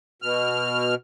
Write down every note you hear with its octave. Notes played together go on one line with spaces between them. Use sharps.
B2 F6